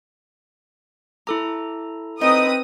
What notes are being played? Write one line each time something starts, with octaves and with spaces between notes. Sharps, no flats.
E4 A4 A#5 D6
C4 D#4 A#4 B4 D#6